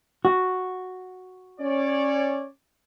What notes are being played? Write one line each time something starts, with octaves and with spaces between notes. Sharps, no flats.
F#4
C#4 C#5 D5